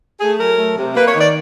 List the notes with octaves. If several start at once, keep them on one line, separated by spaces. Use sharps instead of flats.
A3 G#4
F#3 A#4
A3
C3
A#3 B4
C#5
D#3
D5